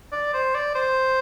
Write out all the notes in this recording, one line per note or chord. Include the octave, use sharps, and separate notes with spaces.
D5
C5
D5
C5